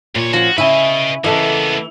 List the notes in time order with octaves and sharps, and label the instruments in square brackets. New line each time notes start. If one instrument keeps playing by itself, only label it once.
[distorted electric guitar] D#2 C#5 [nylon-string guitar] A#2
[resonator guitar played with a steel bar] F3 C#4 [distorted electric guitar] F#4
[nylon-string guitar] C#3 C#5 G#5 [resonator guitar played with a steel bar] E4 [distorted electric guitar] B4 D#5
[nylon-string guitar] C#3 A4 D#5 [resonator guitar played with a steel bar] E3 [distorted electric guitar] A#3 B3